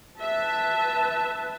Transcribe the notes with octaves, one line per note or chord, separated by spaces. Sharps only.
B4 E5 A5